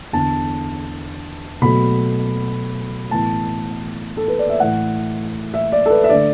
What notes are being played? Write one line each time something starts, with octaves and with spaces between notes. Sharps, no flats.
E2 D3 B3 A5
B2 F#3 A3 B5
A2 E3 B3 A5
A4
B4
D5
E5
A2 E3 A3 F#5
E5
D5
A4
B4
E5
D3 A3 D5